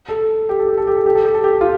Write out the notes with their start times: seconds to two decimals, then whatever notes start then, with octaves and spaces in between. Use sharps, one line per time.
0.09 A4
0.49 G4
0.59 A4
0.68 G4
0.77 A4
0.87 G4
0.97 A4
1.06 G4
1.15 A4
1.25 G4
1.34 A4
1.44 G4
1.61 F4